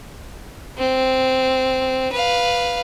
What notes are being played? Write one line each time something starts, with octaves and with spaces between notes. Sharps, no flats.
C4
B4 F5